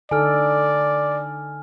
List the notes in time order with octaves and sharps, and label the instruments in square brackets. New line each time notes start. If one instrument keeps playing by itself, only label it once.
[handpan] D3 D#4 A4 [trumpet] D5 [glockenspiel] G#5 F6